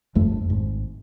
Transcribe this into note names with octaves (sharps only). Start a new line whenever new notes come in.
G1 F2 A3
G#1